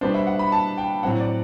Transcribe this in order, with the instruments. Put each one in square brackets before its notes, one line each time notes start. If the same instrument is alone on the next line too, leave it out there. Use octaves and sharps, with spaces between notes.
[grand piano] B2 G3 B3 D4 C5
E5
F#5
B5
A5
G5
A2 F#3 C4 F#5
D5